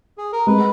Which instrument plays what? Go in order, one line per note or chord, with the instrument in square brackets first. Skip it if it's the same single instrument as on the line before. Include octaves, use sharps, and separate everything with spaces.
[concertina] G#4
A#4
[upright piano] G#3 [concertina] B4